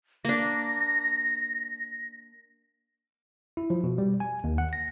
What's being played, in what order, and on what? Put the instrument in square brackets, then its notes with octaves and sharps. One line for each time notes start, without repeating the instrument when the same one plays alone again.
[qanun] A#3 D4 [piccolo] A#6
[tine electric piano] E4
F3
B2
G3
G#5
D#2
F#5
A#6